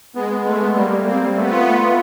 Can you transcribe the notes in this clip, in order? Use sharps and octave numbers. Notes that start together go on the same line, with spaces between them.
G#3 B3
B3
G#3 A3
B3
G3 A#3
G3
A#3 C4
G3
A3 B3
F4
A3
F4